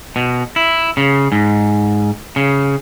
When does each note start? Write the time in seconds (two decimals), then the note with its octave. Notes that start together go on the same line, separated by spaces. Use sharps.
0.16 B2
0.56 E4
0.97 C#3
1.32 G#2
2.36 C#3